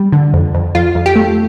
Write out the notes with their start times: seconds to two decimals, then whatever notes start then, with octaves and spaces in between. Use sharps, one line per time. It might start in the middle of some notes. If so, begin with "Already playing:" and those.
Already playing: G3
0.12 D3
0.33 F2
0.54 F2
0.75 F2 F4
0.95 F2
1.06 G4
1.16 A3